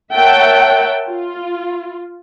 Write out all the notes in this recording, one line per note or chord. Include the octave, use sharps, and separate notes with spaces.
A#4 C#5 E5 F#5 G5 A5
F4